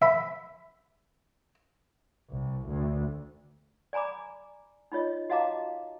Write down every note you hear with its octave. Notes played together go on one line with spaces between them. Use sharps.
E5 B5
C2
D2
D5 G#5 A#5 B5 D6
D#4 F4 C#5 D#5
F#4 D#5 F5 A5 A#5 D6